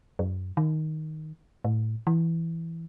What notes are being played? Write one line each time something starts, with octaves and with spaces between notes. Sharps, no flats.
F#2
D#3
A2
E3